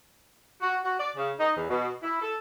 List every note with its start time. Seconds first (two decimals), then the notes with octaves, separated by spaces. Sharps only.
0.62 F#4
0.84 F#4
1.00 D5
1.16 C#3
1.39 D#4
1.56 E2
1.69 B2
2.03 E4
2.21 A4